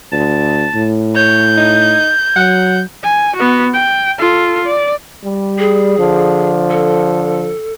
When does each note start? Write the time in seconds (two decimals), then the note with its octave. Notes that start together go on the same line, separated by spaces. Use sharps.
0.12 D2 A5
0.75 A2
1.16 C#5 G6
1.57 D#4
2.36 F#3 F#5
3.03 G#5
3.36 B3 F#4
3.74 G5
4.18 F4 A4
4.65 D5
5.24 G3
5.59 G#4
5.98 D3 F3
6.70 A4